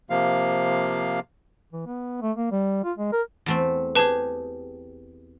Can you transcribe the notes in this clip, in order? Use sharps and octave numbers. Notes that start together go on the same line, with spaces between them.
C3 F3 A#3 F5
E3
B3
A3
A#3
G3
F4
G#3
A#4
E2 A3 C4
G4 G#4 B4 A5